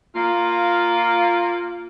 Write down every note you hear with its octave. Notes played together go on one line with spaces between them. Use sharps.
A#3 F4